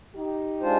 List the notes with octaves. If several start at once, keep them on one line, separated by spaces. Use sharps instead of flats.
D#4 G4
G#3 D4 F4 C5